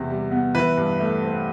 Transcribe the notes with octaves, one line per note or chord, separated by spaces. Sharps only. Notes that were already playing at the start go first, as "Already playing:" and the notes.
Already playing: E2 C3
G3
B3
E3 B4
G2
A3
C4